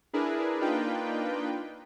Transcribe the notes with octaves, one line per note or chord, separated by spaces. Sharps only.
D4 E4 G#4 A#4 B4
A#3 D4 D#4 F4 B4 G5